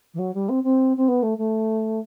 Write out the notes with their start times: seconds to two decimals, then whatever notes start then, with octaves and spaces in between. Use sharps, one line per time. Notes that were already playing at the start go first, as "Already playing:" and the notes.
0.14 E3
0.19 F#3
0.34 G3
0.49 C4
0.64 C4
0.97 C4
1.08 B3
1.23 A3
1.38 A3